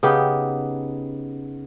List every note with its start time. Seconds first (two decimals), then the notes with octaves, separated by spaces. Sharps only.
0.03 C#3 B3 D#4 G4